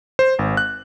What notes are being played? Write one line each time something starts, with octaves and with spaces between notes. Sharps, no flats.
C5
G#1
F#6